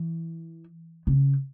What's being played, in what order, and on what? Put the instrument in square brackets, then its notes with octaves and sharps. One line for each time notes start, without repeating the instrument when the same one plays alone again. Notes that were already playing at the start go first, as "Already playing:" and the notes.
Already playing: [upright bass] E3
C#3